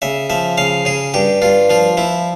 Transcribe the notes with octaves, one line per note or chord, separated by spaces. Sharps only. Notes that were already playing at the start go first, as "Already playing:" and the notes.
C#3 E5
F3 E5
C#3 F5
C#3 G#4
G2 G4
G2 F4
F3 F4
F3 E4